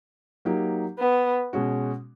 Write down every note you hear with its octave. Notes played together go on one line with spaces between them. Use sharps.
F#3 A#3 D#4 G4
B3
B2 G#3 C#4 F#4